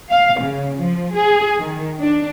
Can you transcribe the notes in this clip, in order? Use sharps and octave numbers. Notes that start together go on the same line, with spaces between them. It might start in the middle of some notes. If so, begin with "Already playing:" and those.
F5
C#3
F3
G#4
D#3
D4